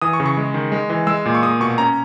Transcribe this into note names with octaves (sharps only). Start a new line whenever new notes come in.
E3 D#6
C#6
C#3
C#6
G#3
D#3
G#3
E3
G#3 E6
A#2
C#6
A#3 D#6
B2 C#6
C#4 A#5